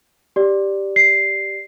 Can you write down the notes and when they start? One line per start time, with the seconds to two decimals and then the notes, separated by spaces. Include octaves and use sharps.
0.36 G4 D5
0.96 C7